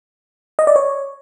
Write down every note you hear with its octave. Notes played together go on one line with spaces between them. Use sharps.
D#5
D5
C#5